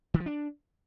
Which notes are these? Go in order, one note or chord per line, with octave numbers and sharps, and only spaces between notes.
D#3
F3
D4